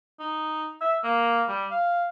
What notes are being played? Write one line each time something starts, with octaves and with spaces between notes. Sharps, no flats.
D#4
E5
A#3
G3
F5